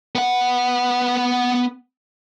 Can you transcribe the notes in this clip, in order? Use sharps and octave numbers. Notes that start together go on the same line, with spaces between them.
B3 F#5